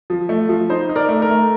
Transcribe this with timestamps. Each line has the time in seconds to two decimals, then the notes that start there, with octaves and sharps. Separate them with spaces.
0.10 F3
0.29 A3
0.49 F3
0.70 D#4 C5
0.89 D#4
0.96 A#4 D5
1.09 A3
1.22 A#4
1.29 A3